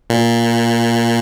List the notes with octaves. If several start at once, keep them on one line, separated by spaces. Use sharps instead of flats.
A#2